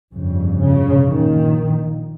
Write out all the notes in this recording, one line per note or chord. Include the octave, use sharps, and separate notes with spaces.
G1 F2 C#3
C#3
A#1 A#2 D#3